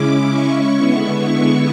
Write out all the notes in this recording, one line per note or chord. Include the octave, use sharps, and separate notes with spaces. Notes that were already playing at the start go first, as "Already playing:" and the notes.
Already playing: C#3 G#3 C#4 E4 D6
C#6
D3 G#3 B3 E4
C#6